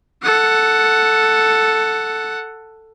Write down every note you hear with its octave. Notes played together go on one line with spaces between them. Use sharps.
A4 F#5